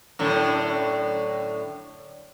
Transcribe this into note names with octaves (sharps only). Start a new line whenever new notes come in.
F#2 A2 D3